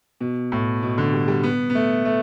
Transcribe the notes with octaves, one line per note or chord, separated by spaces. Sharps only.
B2
A2
B2
D3
G3
G3
B3
B3
A3
A3